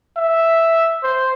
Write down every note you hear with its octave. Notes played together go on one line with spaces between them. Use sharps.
E5
C5